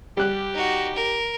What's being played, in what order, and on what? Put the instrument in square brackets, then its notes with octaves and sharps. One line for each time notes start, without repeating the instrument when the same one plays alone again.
[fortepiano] G3 F#6 [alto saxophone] G4
[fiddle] D#4 F#4
A#4